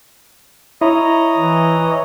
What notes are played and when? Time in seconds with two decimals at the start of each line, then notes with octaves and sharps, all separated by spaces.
0.81 E4 C#5 D#5 A#5
1.38 E3